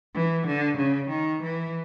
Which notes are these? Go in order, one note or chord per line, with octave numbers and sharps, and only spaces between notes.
E3
D3
C#3
D#3
E3